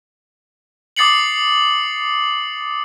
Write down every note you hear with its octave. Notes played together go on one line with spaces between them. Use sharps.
D6 D#6 A6 C7 C#7 F#7